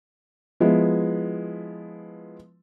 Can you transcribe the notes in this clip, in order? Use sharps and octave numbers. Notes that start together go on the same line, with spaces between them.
F3 G#3 B3 E4